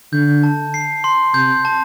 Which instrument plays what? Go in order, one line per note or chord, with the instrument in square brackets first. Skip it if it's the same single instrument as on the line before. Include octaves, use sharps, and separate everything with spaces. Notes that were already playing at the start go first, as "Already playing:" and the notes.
[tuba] D3 [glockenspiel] G6
[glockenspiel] A5
C7
C6
[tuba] C3 [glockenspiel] G6
[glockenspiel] A5